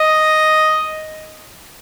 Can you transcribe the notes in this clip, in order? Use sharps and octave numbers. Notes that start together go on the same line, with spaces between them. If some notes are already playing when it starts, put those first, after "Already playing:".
Already playing: D#5